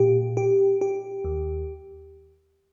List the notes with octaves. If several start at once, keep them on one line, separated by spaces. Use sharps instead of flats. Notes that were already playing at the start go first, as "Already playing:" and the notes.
Already playing: A#2 G4
G4
G4
D#2